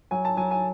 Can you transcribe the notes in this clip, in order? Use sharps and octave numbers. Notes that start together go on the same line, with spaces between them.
F#3 G#5
A5
F#3 G#5
G#5